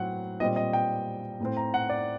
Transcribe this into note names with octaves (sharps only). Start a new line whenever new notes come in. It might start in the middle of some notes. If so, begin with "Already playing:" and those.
Already playing: A2 F#3 C4 F#5
A#2 G3 C4 D#5
D#5
G5
A2 A3 C4
A#5
F#5
D5